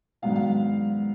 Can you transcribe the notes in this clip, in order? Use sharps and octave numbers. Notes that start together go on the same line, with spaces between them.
G#2 D#3 F#3 B3 D4 F5
F5